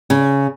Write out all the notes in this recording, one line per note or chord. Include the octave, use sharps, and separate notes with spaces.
C#3